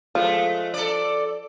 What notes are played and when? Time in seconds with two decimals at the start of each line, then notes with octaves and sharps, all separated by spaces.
0.15 F3 G#3 A3
0.74 A4 D5